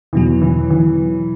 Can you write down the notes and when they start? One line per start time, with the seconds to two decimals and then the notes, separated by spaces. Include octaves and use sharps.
0.13 E2 B2 E3 F#3
0.42 E3
0.70 E3